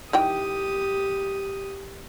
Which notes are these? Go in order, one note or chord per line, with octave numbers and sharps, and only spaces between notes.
D#3 E3 G4 G5 D#6